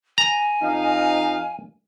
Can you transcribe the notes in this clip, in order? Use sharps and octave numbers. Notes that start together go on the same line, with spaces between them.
G#5 A#5
F2 D#4 F5